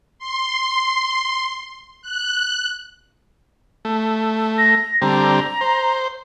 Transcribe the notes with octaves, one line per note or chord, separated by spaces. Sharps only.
C6
F#6
A3
A#6
D3 G3 C4 A#5
C5